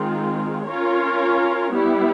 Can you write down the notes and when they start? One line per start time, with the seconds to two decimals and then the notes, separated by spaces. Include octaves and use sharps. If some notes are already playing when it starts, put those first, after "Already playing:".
Already playing: D#3 G#3 C4 F4
0.66 C#4 F4 A#4 C#5
1.72 G3 B3 E4